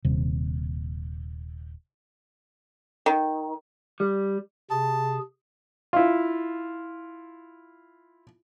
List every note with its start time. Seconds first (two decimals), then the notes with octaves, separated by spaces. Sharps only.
0.05 D#1 C3
3.06 D#3
4.00 G3
4.71 C3 G#4 A5
5.93 E4 F4